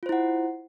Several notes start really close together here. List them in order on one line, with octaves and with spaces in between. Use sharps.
F4 C5 E4 F#5